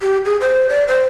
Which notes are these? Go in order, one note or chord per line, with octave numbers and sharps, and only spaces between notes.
G4
G#4
C5
D5
C5